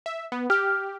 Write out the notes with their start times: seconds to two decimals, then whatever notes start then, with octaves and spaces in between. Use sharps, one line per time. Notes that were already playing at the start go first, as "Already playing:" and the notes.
0.06 E5
0.32 B3
0.50 G4 F6